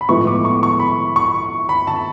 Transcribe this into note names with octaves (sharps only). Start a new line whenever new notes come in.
B5
A2 F3 G#3 B3 C#6
D6
C#6
C#6
B5
C#6
B5
A5